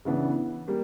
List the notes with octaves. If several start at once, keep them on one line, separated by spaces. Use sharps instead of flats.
C#3 E3 B3 D4
G3 A#3